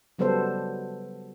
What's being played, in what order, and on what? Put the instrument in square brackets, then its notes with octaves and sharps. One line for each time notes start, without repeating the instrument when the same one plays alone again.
[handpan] C#3 F#3 G3 B3 A4 C5